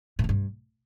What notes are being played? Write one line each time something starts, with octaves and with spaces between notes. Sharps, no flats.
A2
C#3
G2